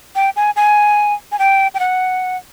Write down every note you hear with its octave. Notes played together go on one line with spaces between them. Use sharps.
G5
G#5
G#5
G#5
G5
G5
F#5